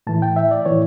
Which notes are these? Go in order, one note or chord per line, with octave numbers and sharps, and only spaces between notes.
A2 E3 A5
G5
E5
D5
A2 E3 C#5